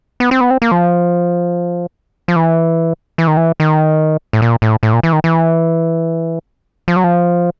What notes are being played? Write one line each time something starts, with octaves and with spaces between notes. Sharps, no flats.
B3
C4
B3
C4
A#3
F3
F3
E3
E3
D#3
E3
D#3
A2
A#2
A2
A2
A#2
E3
D#3
E3
F3
F#3
F3